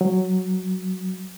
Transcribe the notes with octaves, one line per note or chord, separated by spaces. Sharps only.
F#3